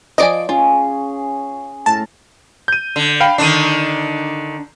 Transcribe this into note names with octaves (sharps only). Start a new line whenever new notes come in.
F3 D5 D#5 G#5 D7
C#4 F4 G#4
A2 A#4 A5
G6 D#7
D3
F5 G5 B5
D3 D#3 D4 C7 D#7